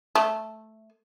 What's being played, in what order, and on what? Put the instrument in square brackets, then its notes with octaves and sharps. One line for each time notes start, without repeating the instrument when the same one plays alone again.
[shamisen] A3